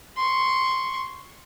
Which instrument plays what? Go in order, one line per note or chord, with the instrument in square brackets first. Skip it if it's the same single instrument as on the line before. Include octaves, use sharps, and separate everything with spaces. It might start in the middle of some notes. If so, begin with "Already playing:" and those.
[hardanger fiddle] C6 C#6